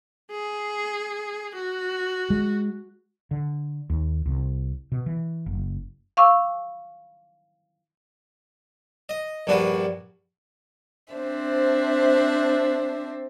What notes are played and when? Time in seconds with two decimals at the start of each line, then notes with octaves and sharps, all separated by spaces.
0.31 G#4
1.55 F#4
2.30 G#3
3.31 D3
3.90 D#2
4.26 C2
4.92 B2
5.06 E3
5.46 F#1
6.17 F5 C#6 D6 E6
9.09 D#5
9.47 A#1 G2 D4 F#4 B4
11.13 C4 D4 C5 E5